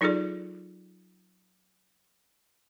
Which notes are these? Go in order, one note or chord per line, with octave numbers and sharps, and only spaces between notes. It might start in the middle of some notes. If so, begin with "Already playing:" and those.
F#3 D#4 F4 G#4 A4 D5